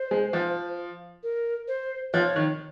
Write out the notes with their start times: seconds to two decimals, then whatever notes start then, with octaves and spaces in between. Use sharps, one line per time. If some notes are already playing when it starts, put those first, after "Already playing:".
Already playing: C5
0.11 G#3
0.33 F3
1.23 A#4
1.68 C5
2.13 F3 C#5
2.36 D#3